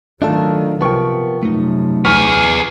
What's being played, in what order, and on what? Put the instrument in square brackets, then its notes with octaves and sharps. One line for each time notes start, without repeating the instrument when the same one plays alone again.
[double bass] D#3 F#3 [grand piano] A3 [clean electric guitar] D4 F4 A4
[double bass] C3 [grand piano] F3 C#6 [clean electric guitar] B3 A#4 G5
[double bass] F#2 C3 [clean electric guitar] A3 D#4
[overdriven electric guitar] B3 G#4 [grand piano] C#6 F6 B6